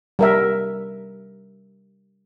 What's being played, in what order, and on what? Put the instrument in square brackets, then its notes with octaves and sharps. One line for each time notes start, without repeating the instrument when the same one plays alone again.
[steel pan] G3 A#4 E5